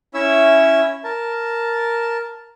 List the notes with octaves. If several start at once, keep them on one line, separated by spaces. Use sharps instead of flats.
C#4 E4 C#5 E5 E6
A#4 A5